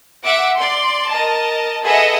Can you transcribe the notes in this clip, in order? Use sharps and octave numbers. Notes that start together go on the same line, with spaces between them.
E5 F#5 D6
D5 C6
A#4 D#5 A5
G#4 A4 B4 D#5 E5 F#5